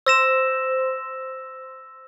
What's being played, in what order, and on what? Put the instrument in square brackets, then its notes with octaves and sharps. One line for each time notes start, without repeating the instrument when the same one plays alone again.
[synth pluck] C5 [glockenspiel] E6 A#6 E7